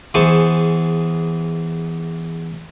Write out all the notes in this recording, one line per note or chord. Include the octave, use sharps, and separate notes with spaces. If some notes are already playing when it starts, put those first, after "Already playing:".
E2 E3 G#4 C5 A5 C#6